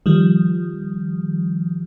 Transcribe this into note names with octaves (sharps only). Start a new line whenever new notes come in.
D#3 F3 G3